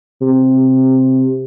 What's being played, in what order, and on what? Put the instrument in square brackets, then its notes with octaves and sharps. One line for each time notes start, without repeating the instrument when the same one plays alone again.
[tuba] C3